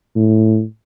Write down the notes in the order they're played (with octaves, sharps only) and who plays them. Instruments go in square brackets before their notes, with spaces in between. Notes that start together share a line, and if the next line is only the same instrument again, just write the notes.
[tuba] A2